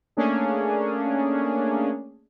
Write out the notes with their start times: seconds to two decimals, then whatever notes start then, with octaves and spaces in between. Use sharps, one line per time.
0.17 A3 A#3 C#4 D4 G#4